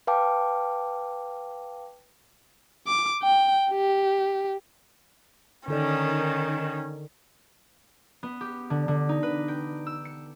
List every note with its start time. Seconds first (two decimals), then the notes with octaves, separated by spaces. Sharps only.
0.07 B4 F5 G5 A5 D6
2.87 D6
3.23 G5
3.71 G4
5.68 D3 D#3 C#4 A4 D5
8.23 B3
8.41 G4
8.70 D3
8.88 D3
9.09 D#4
9.23 B4
9.48 G5
9.87 E6
10.05 C#7